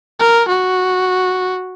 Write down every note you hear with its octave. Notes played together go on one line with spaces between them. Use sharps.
A#4
F#4